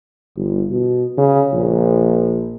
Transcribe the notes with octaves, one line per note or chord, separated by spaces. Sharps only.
G1
B2
C#3
A#1